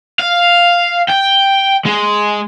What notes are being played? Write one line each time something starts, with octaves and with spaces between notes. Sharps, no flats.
F5
G5
G#3